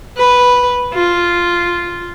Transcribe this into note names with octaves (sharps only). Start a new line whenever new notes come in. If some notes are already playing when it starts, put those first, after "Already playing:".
B4
F4